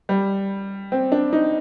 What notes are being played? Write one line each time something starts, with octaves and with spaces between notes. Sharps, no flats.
G3
C4
D4
D#4